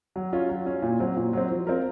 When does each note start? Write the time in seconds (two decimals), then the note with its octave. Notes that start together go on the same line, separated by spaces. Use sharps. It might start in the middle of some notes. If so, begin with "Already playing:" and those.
0.16 F#3
0.33 C#4 F4
0.49 F#3
0.66 C#4 F4
0.82 A#2
1.00 F#3 C4
1.17 A#2
1.33 F#3 C4
1.50 F3
1.67 C4 F4 A#4